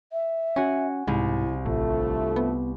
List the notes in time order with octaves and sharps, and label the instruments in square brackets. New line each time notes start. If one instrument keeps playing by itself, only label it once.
[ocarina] E5
[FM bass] C#4 [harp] F#4 G#5
[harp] C2 [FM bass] G#2 [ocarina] E4
[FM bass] A1 [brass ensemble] G2 F3 A3 [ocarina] F4
[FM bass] B3